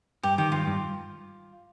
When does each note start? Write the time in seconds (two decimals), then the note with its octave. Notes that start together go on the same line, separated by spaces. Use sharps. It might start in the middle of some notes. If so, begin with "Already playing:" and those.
0.23 G2 G4
0.38 D#3 G4
0.52 G2 F4
0.67 G2